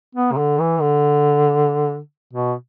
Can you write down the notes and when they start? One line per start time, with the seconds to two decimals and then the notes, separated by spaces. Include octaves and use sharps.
0.15 B3
0.32 C3
0.37 D3
0.60 E3
0.81 D3
2.33 B2